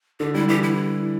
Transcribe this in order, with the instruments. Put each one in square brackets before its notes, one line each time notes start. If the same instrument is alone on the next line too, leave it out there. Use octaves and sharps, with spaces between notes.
[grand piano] D3 [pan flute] G4
[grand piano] G3 [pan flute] E4
[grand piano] E3 [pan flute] G4
[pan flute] E4